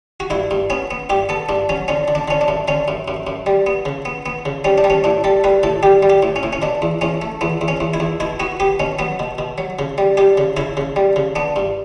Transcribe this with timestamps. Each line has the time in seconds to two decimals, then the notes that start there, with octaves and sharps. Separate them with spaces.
0.20 F#4
0.30 G2 E4
0.51 G2
0.70 B3 C#4
0.91 B3
1.10 G2 G4
1.29 B3 A4
1.49 G2 D4
1.69 F#3 C#4
1.88 D3 C#4
2.08 D3
2.15 D4
2.28 D3 C#4
2.41 D4
2.48 F#2
2.68 D3 C#4
2.88 F#2
3.08 F#2
3.27 F#2
3.46 G3
3.66 B3
3.86 C#3
4.05 B3
4.26 B3
4.45 C#3
4.64 G3 C#4
4.78 D4
4.84 G3
4.90 C#4
5.04 A2 D4
5.24 G3 A4
5.44 G3 B4
5.63 A2 A4
5.83 G3 G4
6.03 G3
6.10 G4
6.23 A2
6.36 C#4
6.43 A2
6.53 C#4
6.62 B2 D4
6.82 E2
7.01 E2 C#4
7.22 A3
7.41 E2 B3
7.61 E2
7.68 C#4
7.80 E2
7.94 E4
8.00 E2
8.20 B2 E4
8.40 B3 F#4
8.60 B3 G4
8.80 B2 C#4
8.99 F#3 B3
9.20 B2
9.38 B2
9.58 F#3
9.79 C#3
9.98 G3
10.17 G3 G4
10.38 C#3
10.57 C#3 E4
10.77 C#3
10.96 G3
11.16 C#3
11.36 B3 D4
11.56 G2